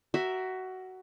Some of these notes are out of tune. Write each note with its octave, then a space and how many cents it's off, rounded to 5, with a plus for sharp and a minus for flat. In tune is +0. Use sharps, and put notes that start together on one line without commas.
F#4 +15 A#4 +0 E5 +0